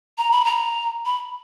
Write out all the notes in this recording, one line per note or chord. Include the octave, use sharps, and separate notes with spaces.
A#5
B5
A#5
B5